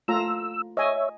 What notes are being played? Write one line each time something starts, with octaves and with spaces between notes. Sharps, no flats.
A3 F4 A#5 E6
C#5 D#5 E5 G#5